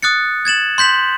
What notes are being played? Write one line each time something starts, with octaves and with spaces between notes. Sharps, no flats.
D#6 F#6 A6 C#7
G#6 A6 E7 F#7
C6 G6 B6 F#7